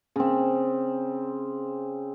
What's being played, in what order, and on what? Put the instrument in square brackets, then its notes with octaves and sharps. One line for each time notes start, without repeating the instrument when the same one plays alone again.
[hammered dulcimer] C#3 C4